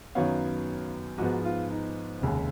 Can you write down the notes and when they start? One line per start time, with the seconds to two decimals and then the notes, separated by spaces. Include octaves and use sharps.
0.15 F#2 D#3 F#3 B3 C#5 F5
1.18 G#2 F3 B3 D#4 F#4
1.45 F4
1.71 D#4
2.21 F1 D#2 C#3 G#3